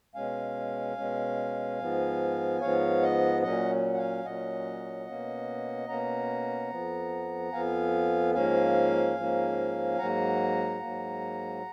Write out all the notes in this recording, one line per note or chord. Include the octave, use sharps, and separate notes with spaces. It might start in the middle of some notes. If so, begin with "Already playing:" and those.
B2 G#3 C#4 F5 G#5
B2 G#3 C#4
G#2 F3 B3
G#2 F3 B3 C#5 F5
D#5 F#5
A#2 F#3 C#4 D#5 F#5
F#5
F5 G#5
A#2 F#3 C#4 D#5 F#5
B2 A#3 C#4
B2 A#3 C#4 F#5 A#5
F2 F3 B3
F2 F3 B3 F5 G#5
G#2 F3 A#3 C#4 F5 G#5
G#2 F3 A#3 C#4
G#2 F#3 A#3 F#5 A#5
G#2 F#3 A#3